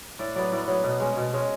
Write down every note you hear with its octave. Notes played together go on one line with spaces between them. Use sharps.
A2 D5
F#3 B3 D5
A2 D5
F#3 B3
B2
G#3 C#4
B2
G#3 C#4